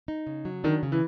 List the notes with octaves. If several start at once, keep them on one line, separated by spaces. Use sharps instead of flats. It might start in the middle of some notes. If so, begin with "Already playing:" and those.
D#4
C#3
F#3
D#3 D4
C#3
E3